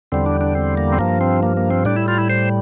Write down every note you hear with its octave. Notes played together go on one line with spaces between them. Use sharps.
E2 D3 G3 C4
D4
D4
C4
A#3
C4
G2 F3 A#3
C4
A#3
A#3
C4
A2 G3 D4
E4
F4
E4
C5